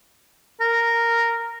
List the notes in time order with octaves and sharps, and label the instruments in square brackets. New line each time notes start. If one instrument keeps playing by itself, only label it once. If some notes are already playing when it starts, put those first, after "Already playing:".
[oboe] A#4